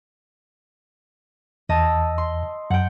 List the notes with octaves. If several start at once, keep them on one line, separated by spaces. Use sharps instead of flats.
E2 D#5 A5 E6
C6
F#2 F#5 G5